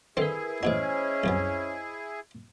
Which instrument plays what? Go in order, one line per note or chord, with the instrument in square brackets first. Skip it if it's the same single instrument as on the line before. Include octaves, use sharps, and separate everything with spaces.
[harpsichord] D3 D#3 C4 [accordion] E4 G#4 [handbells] A#4 B4
[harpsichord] A1 B2 F#4 [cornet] C#4 [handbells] C5 D#5
[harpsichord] C2 F#2 B3